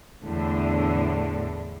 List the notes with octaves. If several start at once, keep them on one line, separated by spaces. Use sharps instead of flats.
E2 A2 D3